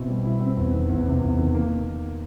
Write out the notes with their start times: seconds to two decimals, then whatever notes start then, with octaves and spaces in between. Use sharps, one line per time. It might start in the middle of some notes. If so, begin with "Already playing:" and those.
Already playing: B2 C4 E4
0.08 G3
0.25 E4
0.41 C4
0.57 E2
0.73 D#3
0.89 E2
1.06 C3
1.21 E2
1.39 D#3
1.54 A#3